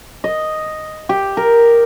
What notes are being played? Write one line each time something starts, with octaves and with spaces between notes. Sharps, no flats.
D#5
G4
A#4